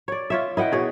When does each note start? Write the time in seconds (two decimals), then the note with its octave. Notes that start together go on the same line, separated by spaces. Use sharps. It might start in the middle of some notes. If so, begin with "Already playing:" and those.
0.08 C#5 D5
0.30 F4 C#5 E5
0.57 E4 D#5 F#5 G5
0.72 B2 G#4 C#5